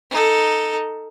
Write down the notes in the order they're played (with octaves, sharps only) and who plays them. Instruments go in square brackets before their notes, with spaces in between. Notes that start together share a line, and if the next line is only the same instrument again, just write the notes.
[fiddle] D#4 A4